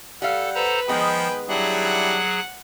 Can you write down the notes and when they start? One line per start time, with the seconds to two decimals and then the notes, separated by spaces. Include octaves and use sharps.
0.22 G3 A4 F5 F#5
0.55 A4 B4 C5 A#5
0.88 D#3 F3 G#3 B3 G#4 G5 B5
1.49 F#3 G3 D4 E4 G#4 F#5
1.85 F#5